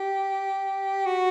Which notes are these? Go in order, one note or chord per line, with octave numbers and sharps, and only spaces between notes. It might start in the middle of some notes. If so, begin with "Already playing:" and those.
Already playing: G4
F#4